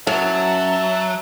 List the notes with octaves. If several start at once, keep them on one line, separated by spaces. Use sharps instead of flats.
F#2 F#3 E5 A5